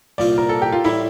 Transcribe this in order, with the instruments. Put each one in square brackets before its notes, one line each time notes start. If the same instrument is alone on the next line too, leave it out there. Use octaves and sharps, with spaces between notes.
[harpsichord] C2 A#2 F3 C4 F4 [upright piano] D5
[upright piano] A#4
A4
G4
F4
[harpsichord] A1 A2 G3 [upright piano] E4